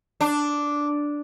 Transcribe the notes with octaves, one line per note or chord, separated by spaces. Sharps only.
D4